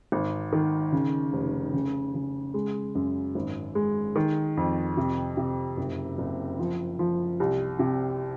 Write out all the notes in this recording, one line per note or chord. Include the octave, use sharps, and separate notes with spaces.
G#1
D#3
C#3
F1
C#3
C#3
G#3
F#2
G#1
G#3
D#3
F2
C3
C3
F#1
F#1
F3
F3
C2
C3